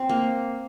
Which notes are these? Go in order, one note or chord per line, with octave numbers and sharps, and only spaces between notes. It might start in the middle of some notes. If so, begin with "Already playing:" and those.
Already playing: C4
A#3